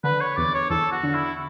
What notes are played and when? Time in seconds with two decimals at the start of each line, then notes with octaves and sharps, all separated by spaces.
0.04 D3 B4
0.20 C#5
0.37 E2 D5
0.54 C#5
0.70 E2 A4
0.92 F#4
1.03 D3
1.14 E4